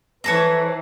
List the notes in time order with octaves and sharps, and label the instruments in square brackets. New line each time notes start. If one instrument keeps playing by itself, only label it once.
[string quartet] E3 [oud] C4 A4 [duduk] B4 [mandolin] C#5 A5 A#5